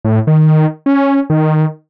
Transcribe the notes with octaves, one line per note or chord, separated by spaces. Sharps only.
A2
D#3
C#4
D#3